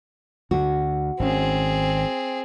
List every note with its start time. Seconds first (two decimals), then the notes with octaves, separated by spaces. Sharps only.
0.51 D2 D3 F#4
1.19 G#1 D#3 C4 C#4 G#4